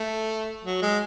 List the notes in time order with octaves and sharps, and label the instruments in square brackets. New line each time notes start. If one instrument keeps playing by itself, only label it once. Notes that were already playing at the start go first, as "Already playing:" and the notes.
Already playing: [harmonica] A3
F#3
G#3